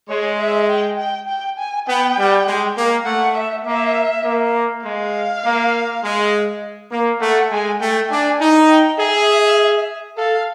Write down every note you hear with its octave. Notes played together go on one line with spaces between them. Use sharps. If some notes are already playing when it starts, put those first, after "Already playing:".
G#3 C#5
E5
G5
G5
G5
G#5
B3 G5
G3
G#3
A#3
A3 F#5
E5
A#3 E5
A#3
G#3 F5
A#3
G#3
A#3
A3 F#5
G#3 G#5
A3 G5
D4 G#5
D#4
G5
G#4 E5
A4 F5